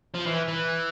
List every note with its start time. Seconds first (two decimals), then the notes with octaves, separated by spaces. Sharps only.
0.15 F3
0.27 E3
0.48 E3